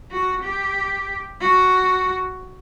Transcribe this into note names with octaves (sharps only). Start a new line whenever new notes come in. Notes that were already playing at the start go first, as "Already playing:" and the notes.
F#4
G4
F#4